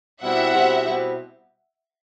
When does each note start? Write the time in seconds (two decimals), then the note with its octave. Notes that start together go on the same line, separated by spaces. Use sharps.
0.22 B2 G3 C4 E4 G4 E5 F#5
0.54 B2 G3 C4 E4 G4
0.85 B2 G3 C4 E4 G4